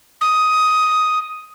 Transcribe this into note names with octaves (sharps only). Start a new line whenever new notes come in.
D#6